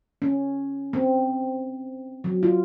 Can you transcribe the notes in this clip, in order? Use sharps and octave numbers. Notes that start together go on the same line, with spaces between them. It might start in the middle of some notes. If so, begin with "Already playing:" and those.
C#4
C4
F#3
F4